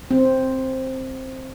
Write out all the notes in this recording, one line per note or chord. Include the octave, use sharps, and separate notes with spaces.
C4